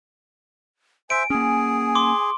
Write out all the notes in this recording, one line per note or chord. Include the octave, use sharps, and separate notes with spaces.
C5 E5 G#5 D7
A#3 C#4 G#4 G#5
C6 D6